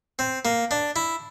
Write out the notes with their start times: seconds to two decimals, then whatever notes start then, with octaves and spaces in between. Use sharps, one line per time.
0.19 C4
0.45 A#3
0.71 D4
0.96 E4